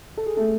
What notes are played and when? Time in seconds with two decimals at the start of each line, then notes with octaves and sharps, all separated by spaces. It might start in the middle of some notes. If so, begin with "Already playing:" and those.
0.17 A4
0.26 G#4
0.37 A3 A4